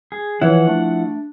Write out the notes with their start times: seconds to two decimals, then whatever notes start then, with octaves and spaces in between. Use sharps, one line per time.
0.12 G#4
0.42 E3 F3 E4 C#5 F#5
0.68 A3 D4